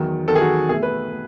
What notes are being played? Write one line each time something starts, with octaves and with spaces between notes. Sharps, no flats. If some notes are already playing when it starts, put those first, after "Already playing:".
Already playing: E2 D#3 F#3
E2 D#3 F#3 A4
G#4
F#4
B2 A3 G#4
B4
A3